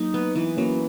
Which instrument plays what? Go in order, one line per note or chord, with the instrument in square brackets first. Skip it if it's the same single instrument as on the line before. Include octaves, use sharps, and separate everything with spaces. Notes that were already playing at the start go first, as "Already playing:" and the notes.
Already playing: [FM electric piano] F#3 A#3 [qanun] D#4
[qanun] B3
E3
[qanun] F#3 [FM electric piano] A#3 C#4